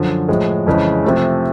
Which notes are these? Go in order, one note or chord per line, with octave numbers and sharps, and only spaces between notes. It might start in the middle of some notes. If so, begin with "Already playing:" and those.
Already playing: F#2 D3 F3
A2 F3 G#3
F2 C#3 E3 G#3
C3 F3 A3